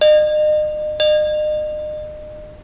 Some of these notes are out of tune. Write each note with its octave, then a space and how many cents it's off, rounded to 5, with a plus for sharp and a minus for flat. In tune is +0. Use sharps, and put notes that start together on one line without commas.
D#5 -40
D#5 -40